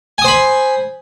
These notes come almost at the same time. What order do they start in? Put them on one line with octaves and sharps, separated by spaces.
G#5 D#6 C5 B5